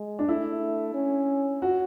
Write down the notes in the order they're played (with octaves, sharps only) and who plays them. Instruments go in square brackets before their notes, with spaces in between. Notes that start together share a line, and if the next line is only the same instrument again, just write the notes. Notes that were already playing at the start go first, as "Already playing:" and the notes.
Already playing: [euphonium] G#3
[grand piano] D4
[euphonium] A3 [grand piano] E4
[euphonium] C#4
[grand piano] F#4